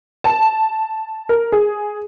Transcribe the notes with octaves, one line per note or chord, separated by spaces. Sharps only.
A5
A#4
G#4